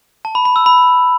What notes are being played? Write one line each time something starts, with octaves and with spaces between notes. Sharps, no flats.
A5
B5
B5
E6
B5